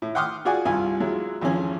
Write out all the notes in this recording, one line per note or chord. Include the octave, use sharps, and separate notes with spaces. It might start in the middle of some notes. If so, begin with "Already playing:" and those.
A2
F#5 G5 C6 D6 D#6 F6
F4 F#4 G#4 D5 F#5 G#5
C2 G2 F4 G#5
F#3 G#3 E4 F4
G#1 F2 E3 C#4 G#4